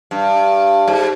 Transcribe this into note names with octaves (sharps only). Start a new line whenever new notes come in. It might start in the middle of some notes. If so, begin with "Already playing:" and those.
G2
G#2